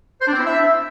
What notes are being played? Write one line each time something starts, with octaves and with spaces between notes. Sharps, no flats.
C5
D4
C4
E4
E5